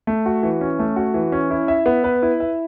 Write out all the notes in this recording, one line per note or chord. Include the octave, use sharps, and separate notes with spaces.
A3
F#4
E3
C#4
A3
F#4
E3
C#4
E4
E5
B3
B4
E4
E5